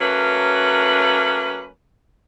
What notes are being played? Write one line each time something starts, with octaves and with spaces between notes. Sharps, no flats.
F#3 A3 A#3 C#4 B4